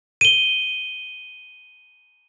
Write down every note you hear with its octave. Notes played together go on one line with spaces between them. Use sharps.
D#7 G7